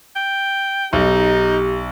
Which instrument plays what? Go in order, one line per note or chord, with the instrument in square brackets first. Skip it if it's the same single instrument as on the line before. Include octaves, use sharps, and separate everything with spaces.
[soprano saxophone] G5
[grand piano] B1 [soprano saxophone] D#4 [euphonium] G4